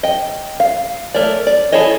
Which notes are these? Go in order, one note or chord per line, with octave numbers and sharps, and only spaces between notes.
D#5 G5
F5
A3 A#4 C#5 D5
D5
E4 G#4 A4 C#5 D#5